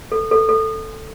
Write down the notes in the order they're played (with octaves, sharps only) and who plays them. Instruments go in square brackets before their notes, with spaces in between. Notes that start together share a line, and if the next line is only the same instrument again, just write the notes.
[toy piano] A4
A4
A4